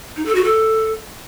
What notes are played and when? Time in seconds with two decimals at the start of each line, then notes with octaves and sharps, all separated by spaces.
0.16 D#4
0.26 A4
0.35 F#4
0.44 A4